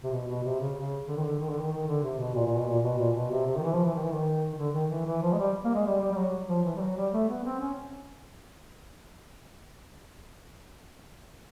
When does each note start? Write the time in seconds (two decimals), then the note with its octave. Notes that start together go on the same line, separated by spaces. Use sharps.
0.03 C3
0.12 B2
0.28 B2
0.44 C3
0.59 C#3
0.76 C#3
1.08 D3
1.16 D#3
1.24 D3
1.39 D#3
1.50 D3
1.59 D#3
1.72 D#3
1.87 D3
2.03 C3
2.19 B2
2.35 A#2
2.46 A#2
2.56 B2
2.67 A#2
2.83 B2
2.98 A#2
3.15 B2
3.31 C3
3.46 C3
3.57 D#3
3.63 E3
3.73 F3
3.84 E3
3.95 D#3
4.04 E3
4.13 D#3
4.53 D#3
4.58 D3
4.74 D#3
4.90 E3
5.06 E3
5.22 F3
5.33 G#3
5.38 G3
5.65 A#3
5.74 G#3
5.86 G3
6.01 G3
6.11 G3
6.17 F#3
6.49 F3
6.65 E3
6.76 G3
6.81 F#3
6.97 G3
7.13 A3
7.29 B3
7.44 C4
7.60 C#4